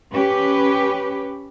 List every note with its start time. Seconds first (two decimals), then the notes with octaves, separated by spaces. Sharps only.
0.13 C#4 G4 B4